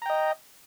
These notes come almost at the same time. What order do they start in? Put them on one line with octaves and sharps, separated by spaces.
A#5 G5 D#5